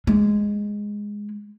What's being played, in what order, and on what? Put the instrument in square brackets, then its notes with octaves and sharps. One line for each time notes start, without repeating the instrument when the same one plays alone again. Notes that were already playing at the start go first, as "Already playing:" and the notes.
[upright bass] G#3